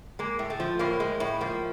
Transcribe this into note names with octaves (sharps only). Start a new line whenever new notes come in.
G#3 A#3
A2
A3
F3
A2 A#3
G#3
A2
F3 A#3